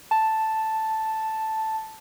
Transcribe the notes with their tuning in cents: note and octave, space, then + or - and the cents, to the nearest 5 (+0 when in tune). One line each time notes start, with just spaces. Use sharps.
A5 +0